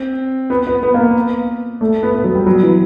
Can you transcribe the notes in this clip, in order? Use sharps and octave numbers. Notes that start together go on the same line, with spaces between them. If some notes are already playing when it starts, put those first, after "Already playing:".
Already playing: C4
B3
B3
B3
A#3
A3
B3
B3
F#3
G3
F#3
E3